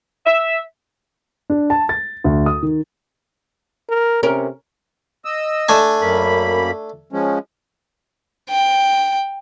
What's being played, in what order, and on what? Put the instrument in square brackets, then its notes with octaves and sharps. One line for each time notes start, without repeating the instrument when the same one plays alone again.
[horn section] E5
[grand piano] D4
A5
A6
D2
D#6
D#3
[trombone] A#4
[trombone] C3 [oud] C#4 A#4
[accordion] D#5 E6
[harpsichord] A3 D4 G#5
[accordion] F#2 A#3 B5
F3 G#3 C#4
[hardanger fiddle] G5